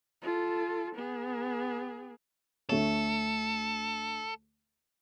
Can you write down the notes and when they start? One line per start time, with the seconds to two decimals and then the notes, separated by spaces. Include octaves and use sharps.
0.22 F4 A4
0.95 B3 G#4
2.69 D2 A3 A4 C#5